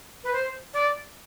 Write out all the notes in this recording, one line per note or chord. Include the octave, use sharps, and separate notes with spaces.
B4
C5
D5